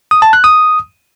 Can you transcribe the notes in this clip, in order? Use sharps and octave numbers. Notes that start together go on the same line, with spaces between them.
D#6
A5
F#6
D#6